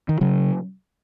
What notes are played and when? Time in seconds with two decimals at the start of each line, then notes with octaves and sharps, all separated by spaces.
0.09 D#3
0.21 C#3 F#3